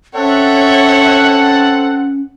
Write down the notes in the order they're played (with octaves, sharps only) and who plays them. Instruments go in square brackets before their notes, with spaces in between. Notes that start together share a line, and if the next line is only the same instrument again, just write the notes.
[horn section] C4 F#5 [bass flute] C#4 [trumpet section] A4 [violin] C#5 E5